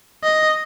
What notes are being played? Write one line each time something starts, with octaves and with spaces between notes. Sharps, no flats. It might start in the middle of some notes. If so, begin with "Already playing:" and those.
D#5